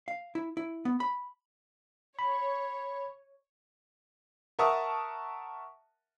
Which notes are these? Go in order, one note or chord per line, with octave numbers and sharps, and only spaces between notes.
F5
E4
E4
B3
B5
C#5 B5
A#4 E5 F#5 A5 C#6 D#6